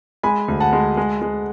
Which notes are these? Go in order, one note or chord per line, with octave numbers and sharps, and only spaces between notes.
G#3 G#5 B5
D2
F#5 A5
G#3
G#3
G#3